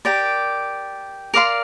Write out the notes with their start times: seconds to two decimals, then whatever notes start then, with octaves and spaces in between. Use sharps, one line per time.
0.05 G4 A#4 D5
1.34 A#4 D5 F5 C6